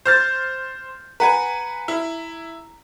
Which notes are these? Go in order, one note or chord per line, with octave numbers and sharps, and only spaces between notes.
C5 F6 G6 A6
B4 F#5 G#5 A#5
E4